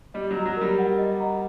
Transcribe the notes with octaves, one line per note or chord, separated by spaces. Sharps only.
G3 D#5
F#3
A#5
F#3
G3 A#4
F#5
D#5
A#5